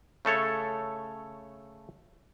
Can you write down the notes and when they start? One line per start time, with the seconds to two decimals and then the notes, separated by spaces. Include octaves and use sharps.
0.25 C#3 A3 A4 C#5